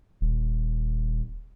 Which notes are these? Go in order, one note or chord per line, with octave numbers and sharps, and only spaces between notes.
D#1